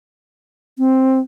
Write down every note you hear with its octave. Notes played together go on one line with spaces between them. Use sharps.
C4